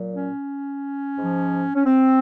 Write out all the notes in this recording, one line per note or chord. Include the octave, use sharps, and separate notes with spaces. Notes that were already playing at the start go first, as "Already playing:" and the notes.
Already playing: A#2 F#3
C#4
G#2 F3
C#4
C4